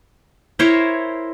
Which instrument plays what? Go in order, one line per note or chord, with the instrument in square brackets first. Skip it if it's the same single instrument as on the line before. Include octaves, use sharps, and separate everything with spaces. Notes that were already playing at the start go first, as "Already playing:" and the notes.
[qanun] E4 A#4 C5 C#5